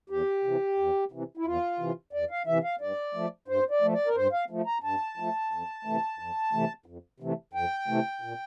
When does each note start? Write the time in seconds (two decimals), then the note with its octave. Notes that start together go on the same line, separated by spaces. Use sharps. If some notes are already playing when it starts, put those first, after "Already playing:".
0.10 E2 G4
0.44 C3 E3
0.78 E2
1.12 C3 E3
1.37 E4
1.45 E2 F4
1.79 C3 E3
2.13 E2 D5
2.31 F5
2.46 C3 E3 E5
2.64 F5
2.81 G2 D5
3.14 F3 A3
3.48 G2 C5
3.71 D5
3.82 F3 A3
3.93 D5
4.07 A#4
4.16 G2 C5
4.33 F5
4.50 F3 A3
4.66 A#5
4.83 G2 A5
5.17 F3 A3
5.51 F2
5.85 C3 E3 A3
6.19 F2
6.53 C3 E3 A3
6.86 F2
7.20 C3 E3 A3
7.53 F2 G5
7.88 C3 E3 A3
8.22 A#2